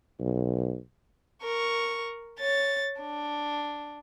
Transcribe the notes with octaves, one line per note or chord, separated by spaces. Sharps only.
B1
A#4 C#6
C#5 A6
D4